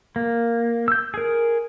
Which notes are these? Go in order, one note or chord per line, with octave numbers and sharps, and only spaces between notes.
A#3
E6 G6
G#4 A#4